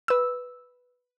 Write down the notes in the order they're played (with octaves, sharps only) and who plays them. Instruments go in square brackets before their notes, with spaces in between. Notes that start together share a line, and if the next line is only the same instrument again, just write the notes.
[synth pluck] B4 E6